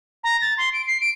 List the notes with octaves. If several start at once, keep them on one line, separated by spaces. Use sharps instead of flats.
A#5
A6
C6
D7
C7
D7